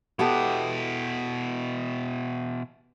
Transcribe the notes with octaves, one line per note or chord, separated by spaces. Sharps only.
B2 B3 E4 G4 A4